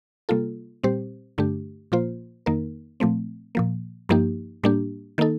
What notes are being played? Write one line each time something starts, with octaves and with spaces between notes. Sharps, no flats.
C3 G3 A#3 F4 A4
A#2 G3 C4 G4 C5
G2 D3 A3 D4 G4
A#2 F3 A#3 F4 C5
F2 D#3 A#3 D#4 A#4
A#2 F3 A3 C4
A#2 F3 A#3
G2 F3 A#3 D#4 G4
A2 G3 A#3 D4 G4
D#3 A#3 D#4 A4